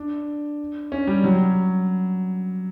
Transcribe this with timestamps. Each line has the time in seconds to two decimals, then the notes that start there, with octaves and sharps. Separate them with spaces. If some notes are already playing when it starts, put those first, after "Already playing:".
Already playing: D4
0.92 C#4
1.07 G3
1.24 F#3